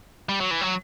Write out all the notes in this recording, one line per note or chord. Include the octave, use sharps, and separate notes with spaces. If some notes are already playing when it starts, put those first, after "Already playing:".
G3
F#3
E3
F#3